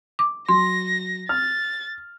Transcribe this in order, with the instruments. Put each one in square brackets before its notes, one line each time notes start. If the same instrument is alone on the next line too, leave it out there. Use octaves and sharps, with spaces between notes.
[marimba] D6
[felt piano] F#3 [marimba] C6 [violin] A#6
[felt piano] F6 [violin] A6